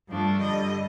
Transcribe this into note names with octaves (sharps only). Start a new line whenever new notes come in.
G2 F3 A3 D4
G2 D3 G3 D#5